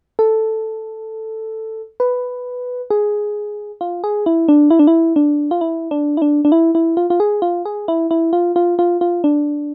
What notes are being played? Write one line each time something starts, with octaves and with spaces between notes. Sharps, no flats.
A4
B4
G#4
F4
G#4
E4
D4
E4
D4
E4
D4
F4
E4
D4
E4
D4
D4
E4
E4
F4
F4
G#4
F4
G#4
E4
E4
F4
F4
F4
F4
D4